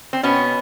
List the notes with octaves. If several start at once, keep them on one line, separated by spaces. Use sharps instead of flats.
C4
B2 B3 C#4